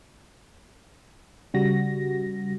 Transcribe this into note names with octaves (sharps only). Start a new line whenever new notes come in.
C#3 G3 F#4 A#6